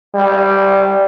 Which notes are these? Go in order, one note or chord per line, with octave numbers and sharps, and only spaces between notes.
G3